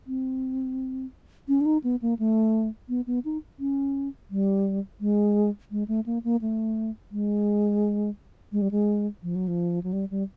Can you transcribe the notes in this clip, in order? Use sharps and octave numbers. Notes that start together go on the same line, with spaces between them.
C4
C#4
D4
D#4
B3
A#3
A3
B3
B3
D#4
C#4
G3
G#3
G#3
A3
A#3
A#3
A3
G#3
G#3
G3
G#3
F3
F#3
F3
F#3
G3
G3